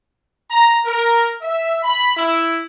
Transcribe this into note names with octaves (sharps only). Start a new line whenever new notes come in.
A#5
A#4
E5
B5
E4